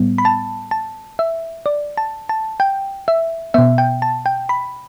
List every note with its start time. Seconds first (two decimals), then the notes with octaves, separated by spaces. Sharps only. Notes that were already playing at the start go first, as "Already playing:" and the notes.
Already playing: A2 G3 B3
0.18 B5
0.25 A5
0.71 A5
1.19 E5
1.66 D5
1.98 A5
2.29 A5
2.60 G5
3.08 E5
3.54 B2 B3 E5
3.78 G5
4.02 A5
4.26 G5
4.49 B5